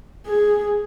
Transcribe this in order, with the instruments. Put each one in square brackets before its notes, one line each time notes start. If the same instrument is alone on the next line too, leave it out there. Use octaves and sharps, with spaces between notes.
[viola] G#4